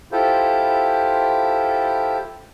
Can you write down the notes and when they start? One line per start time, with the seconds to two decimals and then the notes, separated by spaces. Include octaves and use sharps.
0.12 E4 F4 G4 A4 C5